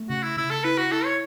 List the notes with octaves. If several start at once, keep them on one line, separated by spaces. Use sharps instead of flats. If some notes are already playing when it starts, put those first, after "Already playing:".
Already playing: A3
C#3 F#4
E4
C#3 E4
A4
E4 B4
F#4
E4 A4
C#5